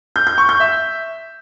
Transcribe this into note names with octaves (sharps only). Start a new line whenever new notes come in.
G6
G6
C#6
G6
E5